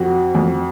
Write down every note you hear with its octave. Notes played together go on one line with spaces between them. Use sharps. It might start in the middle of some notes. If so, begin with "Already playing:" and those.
Already playing: F2 F#4
F2